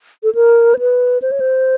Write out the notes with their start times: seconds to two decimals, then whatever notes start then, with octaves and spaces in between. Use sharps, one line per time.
0.23 A4
0.35 A#4
0.74 C5
0.79 B4
1.22 C5
1.31 C#5
1.40 C5